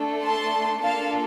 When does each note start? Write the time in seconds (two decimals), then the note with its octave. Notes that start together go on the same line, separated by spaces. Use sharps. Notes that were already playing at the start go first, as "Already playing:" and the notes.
Already playing: A3 D4 A4
0.22 A5 C6
0.83 A#3 D4 F4 A4 F5 A5